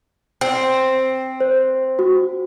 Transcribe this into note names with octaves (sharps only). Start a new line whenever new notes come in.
C4
C5
F#4